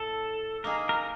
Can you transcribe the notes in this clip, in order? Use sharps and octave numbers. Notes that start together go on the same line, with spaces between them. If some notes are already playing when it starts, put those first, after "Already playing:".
Already playing: A2 A4
A#3 D#4 G#4 A#4
A#4